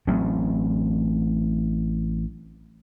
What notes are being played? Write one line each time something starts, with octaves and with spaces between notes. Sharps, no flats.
A1 F#3 A3 C4